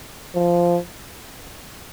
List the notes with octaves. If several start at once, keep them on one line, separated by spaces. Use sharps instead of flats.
F3